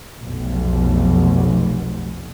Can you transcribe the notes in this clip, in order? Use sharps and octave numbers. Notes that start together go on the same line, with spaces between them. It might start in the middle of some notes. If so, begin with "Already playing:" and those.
F1 B1